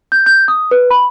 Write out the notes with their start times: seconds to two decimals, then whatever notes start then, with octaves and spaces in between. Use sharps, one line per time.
0.12 G6
0.26 G6
0.48 D#6
0.71 B4
0.91 B5